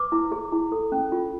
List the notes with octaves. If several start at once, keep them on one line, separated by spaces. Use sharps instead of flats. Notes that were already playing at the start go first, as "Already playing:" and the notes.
Already playing: B4 D6
E4
G#4
E4
A4
C#4
F4